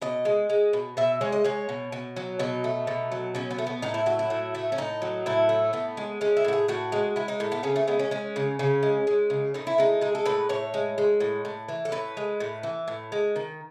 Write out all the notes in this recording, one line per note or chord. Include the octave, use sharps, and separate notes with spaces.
B2 D#5
G#3
G#3
B2
B2 E5
G#3 C#5
D#5
G#3 C#5
B2
B2
F#3
B2 D#4
A3
B2
F#3
B2 C#4
B3
A3
B3
A2 D#4
E4
F#3 F#4
E4
A2
A3
C#4
A2 D#4
F#3
A2 E4
A3
A2 B3
G#3
G#3 C#4
E4
A2 F#4
G#4
A2 F#4
G#3
G#3 E4
D#4
A2
B3
C#3 C#4
A3
G#3 B3
C#4
G#3 C#4
C#3
C#3 C#4
G#3
G#3
C#3
A2 D#4
E4
G#3 D#4
G#3 G#4
A4
A2 B4
A2 C#5
G#3
G#3
A2
A2
E3
A4
A2 B4
G#3
A2
E3
A2
G#3
D#3